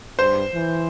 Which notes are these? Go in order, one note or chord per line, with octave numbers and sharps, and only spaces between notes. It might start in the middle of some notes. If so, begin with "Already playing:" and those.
G2 C5
E3